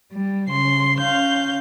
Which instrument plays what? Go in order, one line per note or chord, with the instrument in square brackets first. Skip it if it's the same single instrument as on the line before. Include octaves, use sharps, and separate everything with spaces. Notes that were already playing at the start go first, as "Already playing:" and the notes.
[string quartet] G3
C#3 C6
C#4 F5 G6